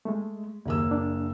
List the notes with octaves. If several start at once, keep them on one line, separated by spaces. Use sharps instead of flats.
G#3 A3
F#1 D#2 A#3 E6
D4